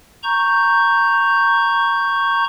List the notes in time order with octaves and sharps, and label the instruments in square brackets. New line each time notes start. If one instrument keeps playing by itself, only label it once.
[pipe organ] A#5 C#6 G6